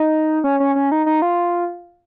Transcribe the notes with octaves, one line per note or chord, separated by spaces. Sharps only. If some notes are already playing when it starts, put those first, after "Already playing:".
Already playing: D#4
C#4
C#4
C#4
D#4
D#4
F4